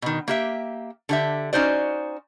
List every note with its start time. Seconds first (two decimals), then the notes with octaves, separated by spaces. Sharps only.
0.02 B2 D#3
0.28 A#3 G4 E5
1.09 D3 G4 E5
1.53 C#4 D#4 F#4 C5 D5